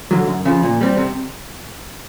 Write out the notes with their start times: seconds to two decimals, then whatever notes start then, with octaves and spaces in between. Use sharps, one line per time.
0.11 D3 F#3
0.28 F#2
0.45 C#3 F3
0.63 A#2
0.81 G3 C4
0.97 C3